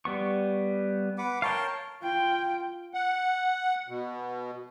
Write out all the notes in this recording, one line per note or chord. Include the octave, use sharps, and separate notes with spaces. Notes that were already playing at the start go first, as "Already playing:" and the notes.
G3 B3 C#6
B4 F#5 D6
A#4 C#5 F5 G5 A5
F4 G5
F#5
B2